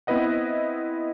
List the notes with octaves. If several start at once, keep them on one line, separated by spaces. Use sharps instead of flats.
B3 C4 E4 B4 D#5 F#5